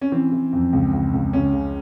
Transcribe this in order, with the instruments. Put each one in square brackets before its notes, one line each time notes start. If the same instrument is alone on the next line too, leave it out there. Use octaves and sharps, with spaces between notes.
[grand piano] C#4
E3 C4
E3
F2
C#2
C#2
C#2
C#2 C#4
C#3